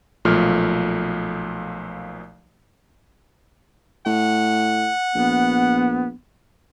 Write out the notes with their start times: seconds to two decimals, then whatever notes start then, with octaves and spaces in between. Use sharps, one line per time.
0.25 B1 A#2 F3 A3 F6
4.06 A2 F#5
5.16 A#1 B3